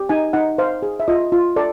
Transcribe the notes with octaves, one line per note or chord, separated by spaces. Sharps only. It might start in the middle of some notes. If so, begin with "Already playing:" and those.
Already playing: G4
D#4 G#5
D#4 F#5
C5 F5
G#4
E5
F4 D#5
F4
A4 D5